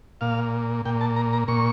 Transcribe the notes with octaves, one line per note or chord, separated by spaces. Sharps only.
A#2 F5
A#2 G5
A5
A#5
A#5
A#2 C#6